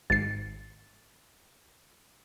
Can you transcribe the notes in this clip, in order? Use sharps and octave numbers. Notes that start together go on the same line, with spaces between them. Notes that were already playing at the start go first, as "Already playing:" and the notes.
G#1 A6 C7